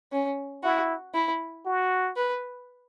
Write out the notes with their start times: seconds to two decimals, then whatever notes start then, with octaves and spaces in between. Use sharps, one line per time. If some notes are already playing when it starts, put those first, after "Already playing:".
0.12 C#4
0.63 E4 F#4
1.14 E4
1.66 F#4
2.16 B4